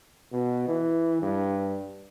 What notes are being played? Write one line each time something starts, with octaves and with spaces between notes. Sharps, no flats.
B2
E3
G2